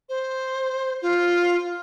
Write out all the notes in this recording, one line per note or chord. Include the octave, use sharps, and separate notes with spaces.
C5
F4